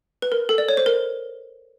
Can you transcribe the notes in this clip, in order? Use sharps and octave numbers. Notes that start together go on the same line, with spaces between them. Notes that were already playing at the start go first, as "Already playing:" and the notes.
B4
A#4
A4
D5
C#5
C5
A#4